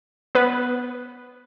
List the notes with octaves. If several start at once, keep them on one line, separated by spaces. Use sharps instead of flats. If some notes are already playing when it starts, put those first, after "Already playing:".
B3 B4